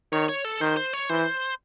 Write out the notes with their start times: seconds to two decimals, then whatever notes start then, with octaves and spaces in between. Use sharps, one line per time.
0.12 D#3 C#5
0.29 C#5
0.44 A4
0.61 D#3 C5
0.77 C5
0.93 C#5
1.09 E3 C5